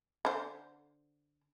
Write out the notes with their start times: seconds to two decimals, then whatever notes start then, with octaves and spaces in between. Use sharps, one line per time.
0.25 D3 C5